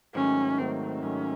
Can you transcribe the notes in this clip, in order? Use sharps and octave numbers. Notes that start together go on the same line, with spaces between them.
G#2 D#3 F#3 A3 C#4
G#2 D#3 F#3 A3 C4
G#2 D#3 F#3 A3 C#4